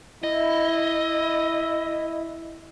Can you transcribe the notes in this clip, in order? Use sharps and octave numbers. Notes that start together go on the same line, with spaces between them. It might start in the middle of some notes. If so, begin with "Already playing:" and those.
E4 D#5